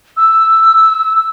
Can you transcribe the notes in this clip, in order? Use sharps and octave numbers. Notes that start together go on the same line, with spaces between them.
E6